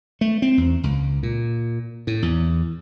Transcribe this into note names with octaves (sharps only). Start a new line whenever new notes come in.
A3
C4
E2
C#2
A#2
A2
E2